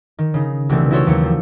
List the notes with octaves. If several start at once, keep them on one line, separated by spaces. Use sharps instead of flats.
D#3
C#3 D#4
C2 B2 E3 G3 A3 C4
D#4 E4 F#4 A4 C5 C#5
D#2 F#3 C#7
F3